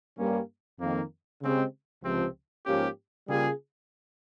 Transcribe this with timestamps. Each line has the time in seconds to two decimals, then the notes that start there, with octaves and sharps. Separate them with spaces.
0.18 G2 G3 A#3 C#4
0.80 F2 D#3 A#3
1.42 C#3 G#3 C4 G4
2.03 C#2 C3 F3 C4
2.66 G#2 F3 A#3 C#4 G4
3.28 C#3 G3 A#3 F4 G#4